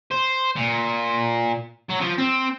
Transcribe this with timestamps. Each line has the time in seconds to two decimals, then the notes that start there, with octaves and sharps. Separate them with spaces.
0.11 C5
0.56 A#2
1.89 F#3
2.00 F3
2.18 C4